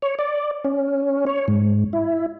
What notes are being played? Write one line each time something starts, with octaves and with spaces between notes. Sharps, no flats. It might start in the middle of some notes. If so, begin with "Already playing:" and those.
C#5
D5
C#4
C#5
G#2
E4